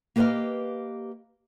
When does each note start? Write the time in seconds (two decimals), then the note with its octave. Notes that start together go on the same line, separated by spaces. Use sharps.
0.16 A#3 G4 B4 C#5 D#5 F5